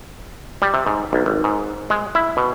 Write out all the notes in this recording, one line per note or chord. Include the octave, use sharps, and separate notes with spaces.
G3
C3
G#2
B1
G#1
G#2
G#3
E4
B2